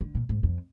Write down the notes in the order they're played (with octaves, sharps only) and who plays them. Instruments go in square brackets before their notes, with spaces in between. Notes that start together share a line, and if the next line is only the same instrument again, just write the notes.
[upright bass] D3
A#2
G#2
F2